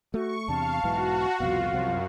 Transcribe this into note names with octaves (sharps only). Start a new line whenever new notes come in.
A3 F#4 C#6
E2 C3 D4 F5 A5
B1 G#2 E3 F#4
C2 F2 B2 F4 F5
C2 F#2 C3 F3